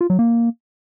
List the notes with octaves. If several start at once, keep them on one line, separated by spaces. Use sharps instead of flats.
F4
F#3
A#3